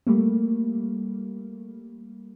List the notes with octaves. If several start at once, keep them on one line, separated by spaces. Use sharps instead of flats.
G3 A3 A#3